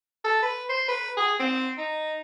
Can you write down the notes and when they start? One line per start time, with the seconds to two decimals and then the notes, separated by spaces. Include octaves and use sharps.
0.24 A4
0.42 B4
0.69 C5
0.88 B4
1.17 G#4
1.40 C4
1.78 D#4